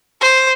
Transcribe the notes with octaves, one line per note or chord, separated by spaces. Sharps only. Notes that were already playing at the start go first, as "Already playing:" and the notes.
C5